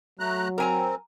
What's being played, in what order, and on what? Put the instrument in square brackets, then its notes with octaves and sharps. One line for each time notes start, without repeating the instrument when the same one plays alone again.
[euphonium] F#3 [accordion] A3 A#5 F#6
[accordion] C4 [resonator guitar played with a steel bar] A#4 G#5 A#5